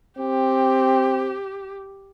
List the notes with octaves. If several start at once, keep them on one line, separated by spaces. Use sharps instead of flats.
C4 G4